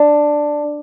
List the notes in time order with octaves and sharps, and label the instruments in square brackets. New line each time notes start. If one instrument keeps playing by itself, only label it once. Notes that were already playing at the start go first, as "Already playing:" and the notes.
Already playing: [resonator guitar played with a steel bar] D4